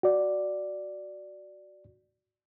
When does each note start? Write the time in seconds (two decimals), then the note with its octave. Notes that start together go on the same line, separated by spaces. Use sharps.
0.03 F#4 D5